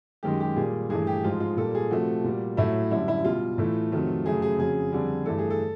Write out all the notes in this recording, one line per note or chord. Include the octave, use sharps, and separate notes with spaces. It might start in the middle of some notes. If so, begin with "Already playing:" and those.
F#2 D#3 G#3 G4
G4
A#2 G3 G#4
G2 E3 A3 G#4
G4
G#2 F3 G#3 F4
F4
A#2 G3 A4
G#4
C3 F3 A3 F#4
A#2 G3
A2 F#3 A3 E4
F#2 D3 G3 E4
E4
B2 G3 F4
A2 E3 A3
F2 C3 D#3 F#3 A3
F#2 C#3 F#3 A3 G#4
G#4
F2 C#3 F#3 G#4
F2 D3 G3
G2 E3 A3 A4
G#4
A4